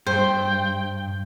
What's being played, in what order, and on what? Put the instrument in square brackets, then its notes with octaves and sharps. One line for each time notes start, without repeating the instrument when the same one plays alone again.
[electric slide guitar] G2 [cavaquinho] C5 [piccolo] G5